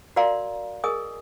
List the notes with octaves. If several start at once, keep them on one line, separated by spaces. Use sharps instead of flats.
F#4 A#4 D5 F5 A#5 C6
G#4 A#4 D#5 G#5 D#6